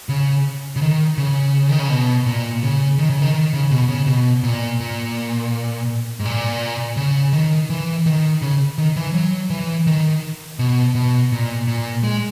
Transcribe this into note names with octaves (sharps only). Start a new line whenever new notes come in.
C#3
C#3
D#3
C#3
D#3
C#3
B2
A#2
C#3
D#3
C#3
D#3
D#3
C#3
B2
C#3
B2
A#2
A#2
G#2
A#2
C#3
D#3
E3
D#3
C#3
D#3
E3
F#3
E3
D#3
B2
B2
A#2
A#2
G#3